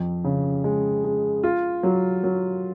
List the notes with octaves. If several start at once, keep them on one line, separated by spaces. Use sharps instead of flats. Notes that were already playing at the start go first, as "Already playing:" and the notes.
Already playing: F2
C#3
G#3
G#3
F4
F#3
F#3